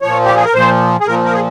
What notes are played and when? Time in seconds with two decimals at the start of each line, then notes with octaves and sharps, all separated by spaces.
0.02 A#2 F3 C#5
0.26 G4
0.36 G#4
0.44 A#4
0.54 A#2 F3 C5
1.01 G#4
1.07 A#2 F3 A#4
1.24 A#4
1.33 G#4